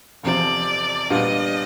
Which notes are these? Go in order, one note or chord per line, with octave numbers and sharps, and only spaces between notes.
F1 E2 C3 F3 D5
A#2 G3 B3 D4 F4 D#5